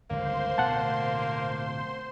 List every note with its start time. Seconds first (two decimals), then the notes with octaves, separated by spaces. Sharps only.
0.10 G1 C#2 F#3 A#3 C5 C6
0.58 D1 B2 A3 F#5 A5